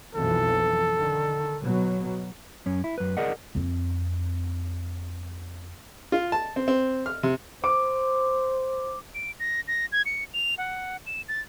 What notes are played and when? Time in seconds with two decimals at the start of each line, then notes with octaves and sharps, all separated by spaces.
0.15 B1 F2 E3 A4
0.95 D3 D#3
1.61 B2 F#3
2.66 F#2 C#4
2.84 E4
2.98 F#2 B4
3.17 G#4 A#4 D5 D#5 F#5
3.55 F2 C4
6.12 F4
6.32 A5
6.56 C4
6.68 C4
7.06 F6
7.23 C3
7.64 C5 D6
9.15 D7
9.40 A#6
9.68 A#6
9.92 G#6
10.06 C#7
10.34 F7
10.58 F#5
11.06 E7
11.28 A6